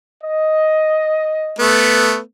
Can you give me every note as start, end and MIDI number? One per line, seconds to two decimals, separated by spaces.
0.24 1.60 75
1.59 2.18 57
1.59 2.18 59